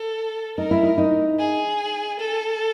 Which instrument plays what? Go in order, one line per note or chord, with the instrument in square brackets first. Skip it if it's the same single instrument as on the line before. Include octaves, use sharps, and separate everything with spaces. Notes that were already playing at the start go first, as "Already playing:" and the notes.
Already playing: [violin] A4
[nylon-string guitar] D#4 [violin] A#4
[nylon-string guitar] E4
D#4
D#4
[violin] G#4
A4